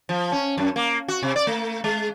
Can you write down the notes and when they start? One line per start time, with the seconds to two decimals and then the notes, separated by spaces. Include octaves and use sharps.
0.09 F3
0.32 C#4
0.58 F#2
0.76 A#3
1.08 F#4
1.23 C3
1.36 D5
1.47 A3
1.84 G#3